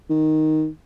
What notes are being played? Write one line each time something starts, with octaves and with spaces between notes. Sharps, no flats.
D#3